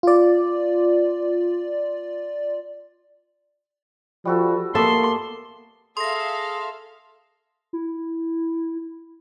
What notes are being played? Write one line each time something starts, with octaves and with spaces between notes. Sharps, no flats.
F4 D5
F3 G3 F#4 A4
A#3 B3 A4 E5 C6 D6
G#4 A4 E5 F5 C6 A#6
E4